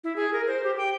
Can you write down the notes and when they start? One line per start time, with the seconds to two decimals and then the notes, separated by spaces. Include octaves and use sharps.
0.04 E4
0.16 G#4
0.33 A#4
0.47 C5
0.64 G4
0.77 G5